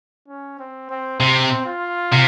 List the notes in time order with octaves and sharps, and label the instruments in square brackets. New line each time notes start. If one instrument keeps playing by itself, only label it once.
[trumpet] C#4
C4
C4
[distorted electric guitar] C3 [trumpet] C4
[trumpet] F4
[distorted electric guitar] C3